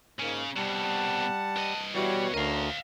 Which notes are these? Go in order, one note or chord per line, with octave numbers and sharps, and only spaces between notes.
G#2 C#3 A#3
C2 B2 G3 F#5 A5
G2 D#5
B2 E3 G3 F#4 C#5
D2 C#4 A#4 D#5 F5